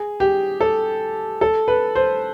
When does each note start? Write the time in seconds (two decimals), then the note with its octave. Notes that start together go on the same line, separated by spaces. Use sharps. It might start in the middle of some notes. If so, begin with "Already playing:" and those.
Already playing: G#4
0.20 G4
0.61 A4
1.41 A4
1.68 B4
1.95 C5